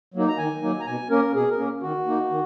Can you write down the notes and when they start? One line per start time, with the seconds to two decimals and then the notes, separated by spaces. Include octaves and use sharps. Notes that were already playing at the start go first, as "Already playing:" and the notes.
0.14 F#3 A#3 D#4
0.28 A#5
0.38 D#3 G#5
0.62 F#3 A#3 D#4
0.80 A#5
0.86 B2 G#5
1.10 A#3 C#4 A#4
1.35 B2 G#4
1.50 A#4
1.59 A#3 C#4
1.82 D#3 F#4
2.07 A#3 D#4
2.30 D#3